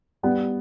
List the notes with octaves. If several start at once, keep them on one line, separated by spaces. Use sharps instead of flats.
G3 B3